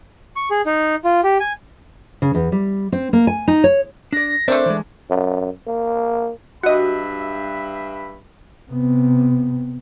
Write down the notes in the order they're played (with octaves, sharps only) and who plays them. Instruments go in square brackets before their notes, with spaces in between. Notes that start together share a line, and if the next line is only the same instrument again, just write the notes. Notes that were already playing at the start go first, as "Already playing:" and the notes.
[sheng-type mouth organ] C#6
G#4
D#4
F4
G4
G#5
[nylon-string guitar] C#3
E2
G3
C4
A#3
G#5
D#4
C#5
[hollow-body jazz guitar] D4 D5 [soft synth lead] A#6
[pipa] A3 D4 [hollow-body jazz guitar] C4 A#4 E5 [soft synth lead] C5
[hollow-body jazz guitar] E3 G#3
[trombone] F#2
A#3
[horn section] G2 E5 B5 [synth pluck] F#4 D#5
[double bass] C3 B3